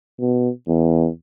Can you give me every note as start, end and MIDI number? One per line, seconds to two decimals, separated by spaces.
0.21 0.49 47
0.68 1.08 40